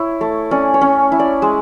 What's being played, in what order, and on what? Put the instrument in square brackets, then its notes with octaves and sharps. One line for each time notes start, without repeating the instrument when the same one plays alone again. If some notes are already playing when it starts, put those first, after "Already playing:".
Already playing: [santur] E4 C#5
A3
C#4 D5
C#5
C#4
E4
D5
G#3